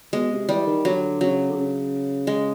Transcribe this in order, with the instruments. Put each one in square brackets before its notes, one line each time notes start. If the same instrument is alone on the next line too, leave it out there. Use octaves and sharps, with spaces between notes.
[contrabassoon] B2 [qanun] G#3
[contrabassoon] C3
[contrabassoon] E3 [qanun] G3
[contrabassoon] D#3
[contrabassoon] D3 [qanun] F#3
[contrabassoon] C#3 [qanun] F#3
[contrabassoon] D3
C#3
[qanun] G#3